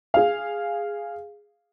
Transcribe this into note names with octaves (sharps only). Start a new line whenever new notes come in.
G#4 F5